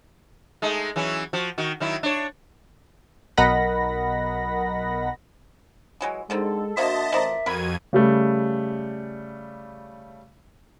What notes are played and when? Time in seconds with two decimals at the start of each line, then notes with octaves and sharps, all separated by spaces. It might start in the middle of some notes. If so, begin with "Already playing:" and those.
0.62 G#3 A3 D#4
0.96 E3 F#3 C#4
1.33 F3 F#4
1.58 D#3 F#4
1.80 D#3 F#3 E4
2.03 D4 C#5
3.37 B1 A#4 D#5 F#5 B5 A#6
6.01 E3 F#3 G#3
6.30 D3 D#3 G#3 C4 A4
6.77 D3 A#3 F#4 C5 D#5 E5 A5
7.13 A1 F2 A#4 C5 D5
7.46 F2 F#4 A#4 B5 G#6 D#7
7.93 C#3 G3 A3